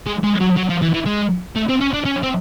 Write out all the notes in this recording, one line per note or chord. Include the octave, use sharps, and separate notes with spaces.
G#3
G#3
F#3
F#3
F3
E3
E3
G#3
A3
C4
C#4
D4
C#4
C4